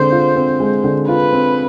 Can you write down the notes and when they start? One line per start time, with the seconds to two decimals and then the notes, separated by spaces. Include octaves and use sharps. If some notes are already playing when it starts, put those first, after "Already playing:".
Already playing: D3 G#3 C4 C5
0.12 F4
0.36 C4
0.60 G#3
0.84 D3
1.08 F4 B4
1.33 C4